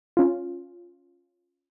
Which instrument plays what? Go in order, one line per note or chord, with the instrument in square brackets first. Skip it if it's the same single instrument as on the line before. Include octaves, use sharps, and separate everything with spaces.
[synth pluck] C#4 F4